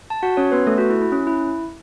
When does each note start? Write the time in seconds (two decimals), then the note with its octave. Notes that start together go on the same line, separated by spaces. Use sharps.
0.10 A5
0.23 F#4 F#5
0.37 C#4 C#5
0.52 B3 B4
0.67 A3 A4
0.78 F#4
0.90 E4
1.02 E4
1.12 C#4
1.27 E4